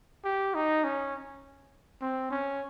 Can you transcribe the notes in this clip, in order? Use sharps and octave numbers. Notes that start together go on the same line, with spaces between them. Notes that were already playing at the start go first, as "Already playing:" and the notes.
G4
D#4
C#4
C4
C#4